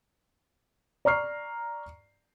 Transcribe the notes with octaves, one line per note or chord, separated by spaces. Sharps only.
D5 A#5 C#6 F6 C7